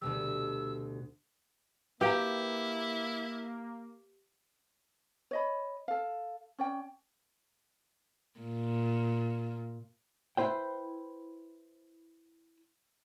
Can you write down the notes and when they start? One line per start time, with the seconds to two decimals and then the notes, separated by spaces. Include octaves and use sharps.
0.01 D2 B2 G3 E6
2.01 A#3 E4 G4 B4 F5 G5 A#5
5.31 C#5 D#5 B5
5.88 A4 F5
6.58 C#4 D5 G5
8.40 A#2
10.37 E4 B4 C5 G5